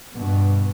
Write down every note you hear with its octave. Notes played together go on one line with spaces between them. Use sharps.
G2 B2